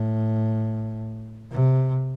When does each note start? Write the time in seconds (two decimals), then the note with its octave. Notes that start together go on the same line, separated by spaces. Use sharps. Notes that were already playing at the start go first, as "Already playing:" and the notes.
Already playing: A2
1.52 C3